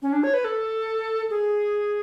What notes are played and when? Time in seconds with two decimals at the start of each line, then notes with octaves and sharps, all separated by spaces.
0.02 C#4
0.13 D4
0.23 C#5
0.34 B4
0.44 A4
1.30 G#4